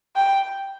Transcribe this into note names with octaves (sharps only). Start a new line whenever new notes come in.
G5